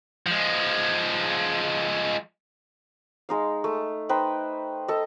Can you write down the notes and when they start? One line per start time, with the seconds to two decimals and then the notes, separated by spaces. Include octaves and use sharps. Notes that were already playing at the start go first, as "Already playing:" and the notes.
0.26 F3 G#3
3.29 G#3 D#4 F5
3.64 A3
4.09 D#4 B4 C5 G5
4.88 A4 D#5